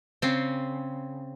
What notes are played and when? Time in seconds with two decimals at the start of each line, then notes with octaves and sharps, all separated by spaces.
0.22 C#3 C4